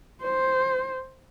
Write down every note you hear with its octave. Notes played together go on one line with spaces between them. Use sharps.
C5